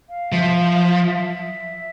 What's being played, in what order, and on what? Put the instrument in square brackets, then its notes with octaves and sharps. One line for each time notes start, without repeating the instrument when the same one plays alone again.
[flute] F5
[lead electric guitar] F3 [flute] E5
[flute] E5